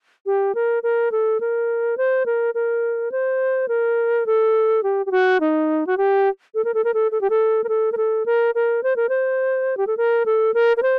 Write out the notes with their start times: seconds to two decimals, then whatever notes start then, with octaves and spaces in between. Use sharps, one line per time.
0.26 G4
0.55 A#4
0.83 A#4
1.12 A4
1.40 A#4
1.97 C5
2.26 A#4
2.55 A#4
3.12 C5
3.68 A#4
4.26 A4
4.83 G4
5.06 G4
5.11 F#4
5.40 D#4
5.87 F#4
5.97 G4
6.55 A4
6.65 A#4
6.74 A4
6.84 A#4
6.94 A4
7.12 A4
7.21 G4
7.30 A4
7.64 A#4
7.69 A4
7.92 A#4
7.97 A4
8.26 A#4
8.55 A#4
8.83 C5
8.96 A#4
9.09 C5
9.77 G4
9.87 A4
9.97 A#4
10.26 A4
10.54 A#4
10.77 A#4
10.83 C5